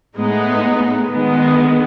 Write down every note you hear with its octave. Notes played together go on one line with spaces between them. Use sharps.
A2 G#3 B3 D#4
D#3 G#3 B3